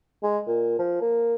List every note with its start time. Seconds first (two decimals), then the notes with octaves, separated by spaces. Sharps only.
0.23 G#3
0.47 A#2
0.79 F3
1.01 A#3